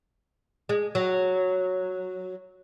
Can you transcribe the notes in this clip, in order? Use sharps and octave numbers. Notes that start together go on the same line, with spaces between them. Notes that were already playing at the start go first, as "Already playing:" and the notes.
G#3
F#3